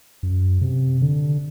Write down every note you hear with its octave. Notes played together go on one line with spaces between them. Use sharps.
F#2
C3
D3